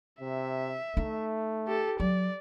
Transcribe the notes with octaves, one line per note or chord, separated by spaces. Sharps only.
C3 E5
A3 D#4
G4 A4
F#3 D5